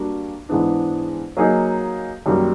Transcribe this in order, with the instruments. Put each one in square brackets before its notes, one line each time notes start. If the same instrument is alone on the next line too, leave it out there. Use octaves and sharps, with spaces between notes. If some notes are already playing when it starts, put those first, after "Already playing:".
Already playing: [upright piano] G3 A#3 D4 F#4
G#2 E3 G#3 B3 D4
F#3 A#3 D#4 G#4
F#2 D#3 G3 A#3